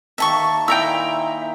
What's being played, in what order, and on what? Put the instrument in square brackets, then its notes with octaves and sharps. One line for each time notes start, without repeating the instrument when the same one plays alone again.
[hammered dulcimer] D#3 A#3 [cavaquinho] E5 A5 C#6
[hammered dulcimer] A#2 [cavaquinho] E4 [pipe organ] E5 [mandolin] G5 A#5 E6